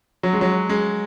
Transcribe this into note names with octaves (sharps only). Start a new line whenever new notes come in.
F#3
G#3
F#3
G#3